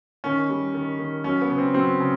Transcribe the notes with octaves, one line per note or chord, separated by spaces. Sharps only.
D#3 C#4
G3
D#3
D#3
F#3 C#4
B3
C#3
C4
F#3 C4
C#3